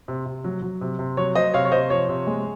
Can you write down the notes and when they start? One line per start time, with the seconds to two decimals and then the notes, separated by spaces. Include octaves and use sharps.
0.08 C3
0.26 C3
0.44 F#3
0.62 F#3
0.81 C3
0.99 C3
1.17 F#3 C#5
1.35 F#3 C5 D#5
1.54 C3 C#5 F5
1.65 C#5
1.72 C3 C5 D#5
1.90 F3 C#5
2.09 C3
2.27 G#3